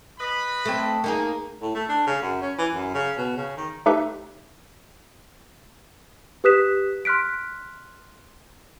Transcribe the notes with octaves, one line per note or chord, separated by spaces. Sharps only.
B4 D#5 B5
A3 C4
A#3 D#4 G#4
A2
A3
D4
C#3
F#2
C#4
E3
F#2
C#3
B2
C#3
D#3
A3 D#4 G4 A4 B4 E5
G4 B4 D#6 F#6 B6 E7
C6 F6 F#6 B6 D7